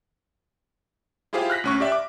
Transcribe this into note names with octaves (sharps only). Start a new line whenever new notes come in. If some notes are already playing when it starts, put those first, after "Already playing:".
E4 F4 G4 G#4 C5 F5
F6 F#6 A#6 B6
D2 C#4 C#6
G4 D5 E5
D6